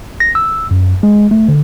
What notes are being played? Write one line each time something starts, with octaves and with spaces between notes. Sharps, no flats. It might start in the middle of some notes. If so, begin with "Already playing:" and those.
A#6
E6
F#2
G#3
A3
D3